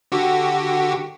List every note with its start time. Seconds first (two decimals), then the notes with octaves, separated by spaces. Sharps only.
0.12 D3 F#4 G4